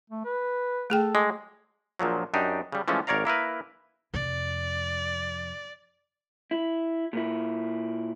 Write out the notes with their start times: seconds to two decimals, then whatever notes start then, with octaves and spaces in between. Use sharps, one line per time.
0.10 A3
0.25 B4
0.90 A3 G#4 A4 G5
1.15 G#3 D6
1.99 A#1 A#2 F3 F#3
2.34 F#2 D4 D#4 G4
2.72 C#3 G3
2.88 E3 F3 G#3 A3 C#4
3.07 G#1 A#4 C#5 D5 F5 A#5
3.25 A#3 E4 A#4 B4
4.14 F2 C3 D5
6.51 E4
7.13 A#2 E4